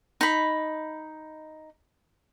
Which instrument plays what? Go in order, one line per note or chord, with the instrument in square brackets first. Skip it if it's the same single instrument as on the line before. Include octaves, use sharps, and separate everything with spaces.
[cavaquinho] D#4 B5